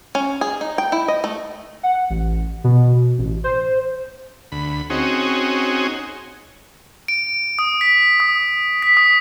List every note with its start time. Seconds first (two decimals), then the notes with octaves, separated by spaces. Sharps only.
0.15 C#4
0.41 G#4
0.61 D#4
0.78 G5
0.92 E4
1.08 D#5
1.24 A3
1.83 F#5
2.10 A1
2.64 B2
3.18 A1
3.44 C5
4.52 D2 B5
4.90 C4 C#4 D#4 F#4 G#4
7.08 D7
7.59 D#6
7.81 B6
8.20 D#6
8.82 B6
8.97 D#6